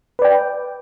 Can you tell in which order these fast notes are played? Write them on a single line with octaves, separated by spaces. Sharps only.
B4 D5 G5